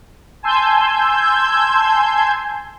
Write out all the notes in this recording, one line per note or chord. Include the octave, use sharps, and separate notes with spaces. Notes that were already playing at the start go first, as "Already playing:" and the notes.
G#5 A5 C6 E6 G6 G#6